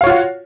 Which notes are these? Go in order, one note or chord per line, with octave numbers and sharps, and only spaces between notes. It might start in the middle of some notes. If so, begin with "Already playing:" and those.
F4 F#4 C#5 F5